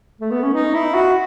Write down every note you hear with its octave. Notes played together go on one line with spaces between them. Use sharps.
A3
B3
C#4
D#4
E4
F#4